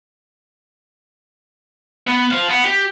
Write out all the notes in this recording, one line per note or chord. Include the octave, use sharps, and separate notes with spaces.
B3
C5 F5
B3
G4